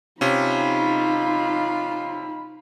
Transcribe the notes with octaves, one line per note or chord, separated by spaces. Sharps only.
C3 C#4 D#4 F4 B5